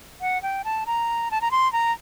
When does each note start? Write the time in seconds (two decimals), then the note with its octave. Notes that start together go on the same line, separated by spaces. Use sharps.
0.21 F#5
0.43 G5
0.64 A5
0.86 A#5
1.31 A5
1.41 A#5
1.51 C6
1.73 A#5